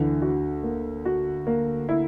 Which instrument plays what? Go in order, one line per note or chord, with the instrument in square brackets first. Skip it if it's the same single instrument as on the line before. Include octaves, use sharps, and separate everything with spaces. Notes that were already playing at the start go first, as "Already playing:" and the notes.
Already playing: [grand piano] D2 D3 [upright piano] E3
[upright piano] F#4
A#3
F#4
A#3
E4